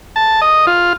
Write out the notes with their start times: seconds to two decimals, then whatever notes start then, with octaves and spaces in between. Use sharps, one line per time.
0.16 A5
0.41 D#5
0.67 F4